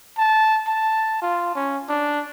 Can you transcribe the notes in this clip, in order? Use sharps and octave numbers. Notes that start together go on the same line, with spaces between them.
A5
A5
F4
C#4
D4